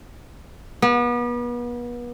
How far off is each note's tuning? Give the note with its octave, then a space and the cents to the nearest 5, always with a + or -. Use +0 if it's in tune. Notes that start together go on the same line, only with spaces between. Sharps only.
B3 -35